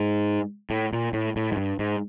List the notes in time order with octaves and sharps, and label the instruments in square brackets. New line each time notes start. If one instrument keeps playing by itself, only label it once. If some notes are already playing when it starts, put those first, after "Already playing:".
Already playing: [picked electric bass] G#2
A2
A#2
A2
A2
G#2
G2
G#2